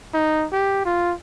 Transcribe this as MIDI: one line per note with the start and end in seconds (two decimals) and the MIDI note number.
0.14 0.46 63
0.52 0.81 67
0.85 1.14 65